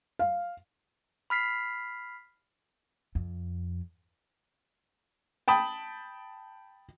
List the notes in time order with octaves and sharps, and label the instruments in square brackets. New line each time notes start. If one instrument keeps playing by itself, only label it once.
[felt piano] F5
[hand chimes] B5 F6 B6 C7
[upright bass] F2
[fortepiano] G5 A5 B5 D#6